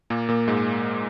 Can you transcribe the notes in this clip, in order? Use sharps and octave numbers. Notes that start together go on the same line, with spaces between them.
A#2 A#3
A#2 A#3
G#2 G#3